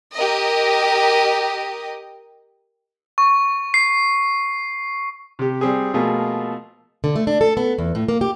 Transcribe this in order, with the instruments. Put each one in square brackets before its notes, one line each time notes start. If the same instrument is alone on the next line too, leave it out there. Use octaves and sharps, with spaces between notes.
[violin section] G4 A#4 D#5
[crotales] C#6
C7
[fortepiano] C3 G4
G3 C4 G#4
B2 F3 A3 A#3 F4 G#4
[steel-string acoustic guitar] D3
A3
D4
A4
B3
E2
A2
A#3
G4